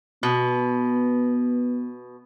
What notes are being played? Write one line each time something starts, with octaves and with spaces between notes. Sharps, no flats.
B2 B3